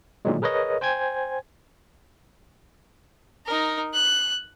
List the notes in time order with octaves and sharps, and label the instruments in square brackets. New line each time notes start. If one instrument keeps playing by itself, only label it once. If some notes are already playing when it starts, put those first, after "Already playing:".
[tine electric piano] A#2 D3 D#3 F#3 G#3
G#4 A#4 B4 C#5 D#5
C5 G5 G#5 G#6
[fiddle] D#4 A#4
F#6